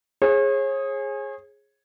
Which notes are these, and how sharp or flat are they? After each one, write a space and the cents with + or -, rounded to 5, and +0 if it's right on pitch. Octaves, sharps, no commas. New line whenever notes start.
G#4 +0 C#5 -40